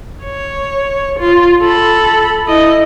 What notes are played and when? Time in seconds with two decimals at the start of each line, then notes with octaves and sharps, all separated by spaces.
0.24 C#5
1.19 F4
1.62 A4 B5
2.47 E4 D#5